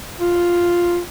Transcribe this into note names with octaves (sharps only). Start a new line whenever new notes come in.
F4